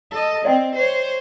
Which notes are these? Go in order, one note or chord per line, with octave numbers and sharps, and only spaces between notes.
A4 D#5
C4 D5 D#5 G5
C5 C#5